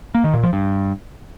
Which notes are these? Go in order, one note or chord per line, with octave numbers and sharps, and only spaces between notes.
A#3
D#3
A#2
F3
G2